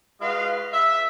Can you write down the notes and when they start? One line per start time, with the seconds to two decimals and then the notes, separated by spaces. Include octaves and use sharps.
0.20 G#3 F4 F#4 B4 D#5 F5
0.73 E5